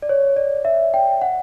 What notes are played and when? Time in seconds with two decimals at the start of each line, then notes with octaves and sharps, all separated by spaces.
0.02 D5
0.09 C#5
0.36 D5
0.65 E5
0.94 G5
1.21 F#5